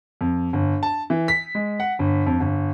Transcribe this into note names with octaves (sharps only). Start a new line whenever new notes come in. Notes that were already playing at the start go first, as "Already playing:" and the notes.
F2
G1
A5
E3
B6
G#3
F#5
G1
F2
G1